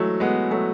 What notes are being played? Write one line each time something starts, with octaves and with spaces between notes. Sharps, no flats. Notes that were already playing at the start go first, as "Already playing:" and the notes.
Already playing: E3 F#3 G#3 A3
G#3 B3
F#3 A3